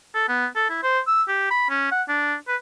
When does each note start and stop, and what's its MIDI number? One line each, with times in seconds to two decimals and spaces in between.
0.15 0.24 69
0.28 0.46 59
0.56 0.67 69
0.70 0.82 64
0.83 1.00 72
1.07 1.23 88
1.28 1.46 67
1.50 1.67 83
1.69 1.87 61
1.91 2.03 78
2.08 2.35 62
2.48 2.56 71